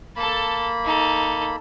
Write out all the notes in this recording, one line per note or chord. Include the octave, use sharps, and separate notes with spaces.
A#3 A4 A5 B5
D#4 A4